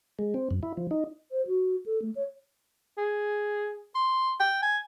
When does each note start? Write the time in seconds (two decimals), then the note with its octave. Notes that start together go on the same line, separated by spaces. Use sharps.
0.19 G#3
0.34 C4
0.51 F#2
0.63 E4
0.77 F3
0.91 D#4
1.31 C5
1.47 F#4
1.86 A4
2.02 A3
2.15 C#5
2.98 G#4
3.95 C6
4.40 G5
4.63 G#5